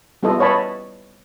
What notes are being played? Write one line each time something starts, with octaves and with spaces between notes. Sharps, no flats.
G3 B3 E4 F4 A4 D#5
B4 C#5 D#5 A5 B5